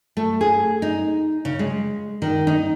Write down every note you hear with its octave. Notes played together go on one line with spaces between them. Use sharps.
A3
G#4
D#4
C#3
G#3
D#3
D#4